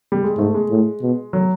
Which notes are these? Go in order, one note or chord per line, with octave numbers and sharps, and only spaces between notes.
G3
G#3
G#2 A3
G#3
A2
B2
F#3